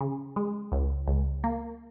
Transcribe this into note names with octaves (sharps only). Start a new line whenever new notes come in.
C#3
G#3
C#2
C#2
A#3